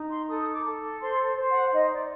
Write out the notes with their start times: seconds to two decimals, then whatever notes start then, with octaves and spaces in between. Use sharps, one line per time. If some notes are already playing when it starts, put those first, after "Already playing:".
Already playing: D#4
0.09 C6
0.27 A4 D#6
0.52 D6
0.64 A4
1.00 C5 C6
1.36 C5
1.49 F#5
1.73 D#4 D#5
1.91 D5